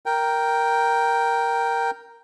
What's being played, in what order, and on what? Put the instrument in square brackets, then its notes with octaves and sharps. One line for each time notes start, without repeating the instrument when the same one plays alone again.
[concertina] A#4 G5